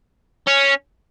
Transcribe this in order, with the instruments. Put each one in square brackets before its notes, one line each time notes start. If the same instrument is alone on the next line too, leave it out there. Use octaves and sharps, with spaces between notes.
[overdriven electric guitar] C#4